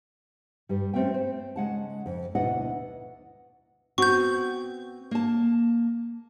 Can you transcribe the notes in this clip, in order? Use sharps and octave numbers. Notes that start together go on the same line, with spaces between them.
G2 G3
A3 C4 C#4 E5 G5
C5
C#3 G#3 F#5 A5
F2
D2 B2 D4 E4 D#5 F#5
B3 C4 F#4 C#6 G6
A#3 A5